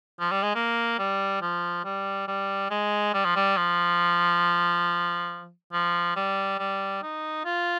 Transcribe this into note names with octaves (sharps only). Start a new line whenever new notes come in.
F3
G3
G#3
A#3
G3
F3
G3
G3
G#3
G3
F3
G3
F3
F3
G3
G3
D#4
F4